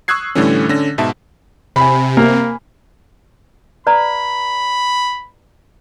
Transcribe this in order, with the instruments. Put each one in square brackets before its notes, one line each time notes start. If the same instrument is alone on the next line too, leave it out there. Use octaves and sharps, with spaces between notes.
[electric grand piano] C#6 D#6 E6 F#6 G#6 C7
A2 D3 E3 G3 A3 C#4
D3 C#4 A#6
G#2 B2 E5 A5
[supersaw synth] C3 [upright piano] G#5 B5
[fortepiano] A#3
[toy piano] B4 D5 A#5 [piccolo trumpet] B5